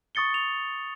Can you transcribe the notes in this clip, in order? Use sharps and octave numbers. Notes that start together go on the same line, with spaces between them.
C#6 D#6 A6 C#7 G7
F7